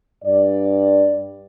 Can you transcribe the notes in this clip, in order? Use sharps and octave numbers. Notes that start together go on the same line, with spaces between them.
G2 D5